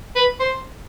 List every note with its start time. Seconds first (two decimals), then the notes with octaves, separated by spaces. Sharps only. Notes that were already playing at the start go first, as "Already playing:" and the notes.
0.16 B4
0.39 C5